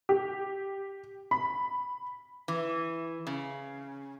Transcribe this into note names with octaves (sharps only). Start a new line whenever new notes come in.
G4
B5
E3
C#3